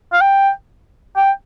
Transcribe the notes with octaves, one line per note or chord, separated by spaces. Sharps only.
F5
G5
G5